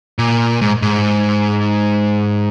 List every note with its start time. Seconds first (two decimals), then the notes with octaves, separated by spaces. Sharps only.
0.19 A#2
0.61 G#2
0.82 G#2